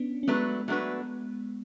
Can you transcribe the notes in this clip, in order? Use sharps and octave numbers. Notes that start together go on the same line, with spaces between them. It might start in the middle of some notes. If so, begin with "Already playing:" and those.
Already playing: B3 C#4 D4
C#4
F#3 G#3 A3 B3 D4 F#4 B4
F#3 A3 D4 F#4 B4